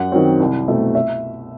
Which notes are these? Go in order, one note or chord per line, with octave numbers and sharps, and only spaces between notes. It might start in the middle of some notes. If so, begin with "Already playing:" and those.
Already playing: F#2 F#5
D#3 F#3 C4
C2
B2 A3 C4
E5